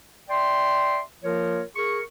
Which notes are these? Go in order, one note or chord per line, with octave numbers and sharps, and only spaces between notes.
D5 E5 G5 C6
F3 A#3 F4 A#4 C#5
G#4 A#4 C#6